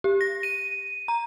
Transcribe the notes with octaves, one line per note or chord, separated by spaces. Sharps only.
G4
A#6
D#7
A#5